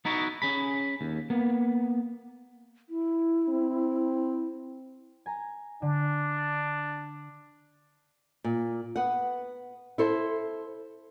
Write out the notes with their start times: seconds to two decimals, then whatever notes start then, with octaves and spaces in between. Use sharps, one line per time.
0.05 B3 D#4 E4 F#4
0.42 C#4 G#4 B5
1.01 D#2
1.30 A#3 B3
2.89 E4
3.49 C4
5.26 G#5 A#5
5.82 D3 D4
8.44 A#2
8.96 B3 F#5
9.98 E4 A4 C5